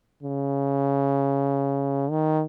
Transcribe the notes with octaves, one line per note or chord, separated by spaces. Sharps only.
C#3
D#3